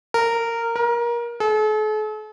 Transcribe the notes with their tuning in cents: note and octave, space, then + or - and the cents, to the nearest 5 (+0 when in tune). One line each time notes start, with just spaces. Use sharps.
A#4 -15
A#4 +25
A4 -45